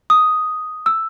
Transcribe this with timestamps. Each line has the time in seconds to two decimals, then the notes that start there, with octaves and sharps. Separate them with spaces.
0.10 D#6
0.86 E6